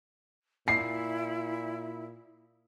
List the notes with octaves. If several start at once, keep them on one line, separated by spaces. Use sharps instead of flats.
A#2 E4 C7